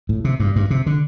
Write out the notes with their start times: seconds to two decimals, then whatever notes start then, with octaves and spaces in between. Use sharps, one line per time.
0.09 A2
0.25 C3
0.40 G2
0.56 G2
0.71 C3
0.86 D3